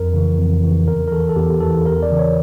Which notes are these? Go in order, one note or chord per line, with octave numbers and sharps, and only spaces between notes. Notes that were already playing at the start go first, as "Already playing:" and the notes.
Already playing: F2 A#4
C#3 E3
F2
C#3 E3
E2 A#4
A#4
E3 A4
A4
E2 G4
E3 A4
E2 A#4
D5
C#3 E3
C#5